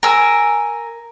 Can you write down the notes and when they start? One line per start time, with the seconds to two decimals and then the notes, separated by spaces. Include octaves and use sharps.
0.03 A#4 G#5 E6